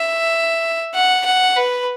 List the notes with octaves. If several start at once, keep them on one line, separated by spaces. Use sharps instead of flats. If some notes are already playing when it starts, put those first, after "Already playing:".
Already playing: E5
F#5
F#5
B4